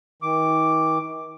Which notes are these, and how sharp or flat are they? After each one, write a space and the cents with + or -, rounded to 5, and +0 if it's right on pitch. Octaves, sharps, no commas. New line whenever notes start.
D#3 +40 D6 +0